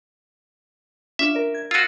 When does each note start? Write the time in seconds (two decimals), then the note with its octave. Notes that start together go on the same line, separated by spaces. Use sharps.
1.19 C#4 D4 F4 E5
1.35 A#4 D5
1.54 G#6
1.71 F4 F#4 E6 G#6 A6